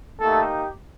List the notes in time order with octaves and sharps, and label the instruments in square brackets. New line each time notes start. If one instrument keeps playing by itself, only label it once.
[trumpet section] A3 A#3 D#4 G4 A4